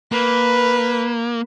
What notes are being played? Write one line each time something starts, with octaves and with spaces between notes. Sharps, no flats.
A#3 B4